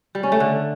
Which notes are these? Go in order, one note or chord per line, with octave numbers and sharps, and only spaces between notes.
G3
C#4
A3
D3